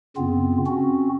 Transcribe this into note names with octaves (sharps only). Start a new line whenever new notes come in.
F#2 C#3 B3 C4 F4
C4 C#4 F#4